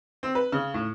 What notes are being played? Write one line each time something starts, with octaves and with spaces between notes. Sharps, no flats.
C4
B4
C#3
A2